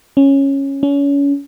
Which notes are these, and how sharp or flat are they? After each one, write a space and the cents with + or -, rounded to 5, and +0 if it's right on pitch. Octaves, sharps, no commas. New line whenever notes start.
C#4 -10
C#4 +30